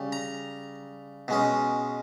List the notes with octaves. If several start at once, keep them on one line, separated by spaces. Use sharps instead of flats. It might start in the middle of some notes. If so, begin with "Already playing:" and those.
Already playing: C#3 G3
A#5
B2 G#3 C#4